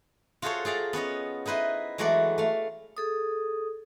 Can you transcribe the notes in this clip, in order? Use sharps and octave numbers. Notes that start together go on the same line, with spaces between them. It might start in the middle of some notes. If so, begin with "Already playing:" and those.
F4 F#4 G#4 A4 C5 C#5
F4 G#4 D5 A#5
B3 C#4 C#5 D#5
D#4 E4 B4 C5 D#5
E3 F#3 G#3 A3 F#4 D5
A3 F5
G#4 A4 D#6